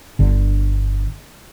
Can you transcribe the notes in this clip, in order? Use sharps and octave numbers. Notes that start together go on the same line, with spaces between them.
G1 D3